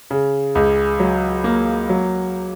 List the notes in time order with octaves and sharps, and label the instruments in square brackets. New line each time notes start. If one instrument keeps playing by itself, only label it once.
[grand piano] C#3
C#2
F#3
A#3
F#3